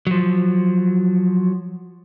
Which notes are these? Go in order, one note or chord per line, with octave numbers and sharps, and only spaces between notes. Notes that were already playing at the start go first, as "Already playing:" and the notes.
F3 F#3